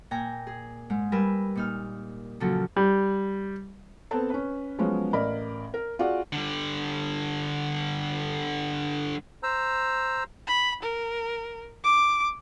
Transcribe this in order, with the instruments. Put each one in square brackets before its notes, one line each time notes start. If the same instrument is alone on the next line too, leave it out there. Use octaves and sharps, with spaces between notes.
[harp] A#2 G5 G#5 A#5 G6
G#4
G#2 G#3
G3 A#4 B4 G#5 E6
A#2 D#4 F6
A#2 C#3 F3 F#3 A4
[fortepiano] G3
[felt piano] B3 C4 A4 C5 A5
C#4 B4
F3 F#3 G#3 B3 C#4
A1 A#4 D5 D#5 B5
A#4
F4 F#4 G#4 D5 F#5
[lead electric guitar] D3 G3
[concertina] C5 A#5 E6
[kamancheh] B5
A#4
D6